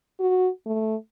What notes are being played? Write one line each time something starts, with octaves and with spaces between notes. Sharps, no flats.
F#4
A3